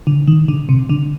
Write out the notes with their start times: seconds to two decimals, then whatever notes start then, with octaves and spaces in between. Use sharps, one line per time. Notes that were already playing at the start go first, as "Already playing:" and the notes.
0.07 D3
0.28 D#3
0.48 D3
0.69 C3
0.89 D3